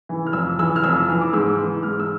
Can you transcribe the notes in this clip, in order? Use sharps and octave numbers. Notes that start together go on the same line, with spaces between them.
E3
F6
F2 E6
E3 E6
F6
F2 E6
E3
D6
G#2 E6
E3
G#2 F6
E6